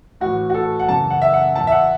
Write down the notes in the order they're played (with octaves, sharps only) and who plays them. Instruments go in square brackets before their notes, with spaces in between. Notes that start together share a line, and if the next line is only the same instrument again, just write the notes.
[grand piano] A2 E3 F#4
F#4
A4
F#5
F#2 C#3 E3 A5
F#5
E5
F#5
E2 E3 A5
E5
F#5